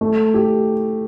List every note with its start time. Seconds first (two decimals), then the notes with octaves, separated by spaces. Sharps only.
0.01 A3
0.34 G4